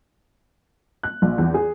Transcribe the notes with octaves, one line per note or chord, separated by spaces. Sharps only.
F#6
A#1
E2
G#4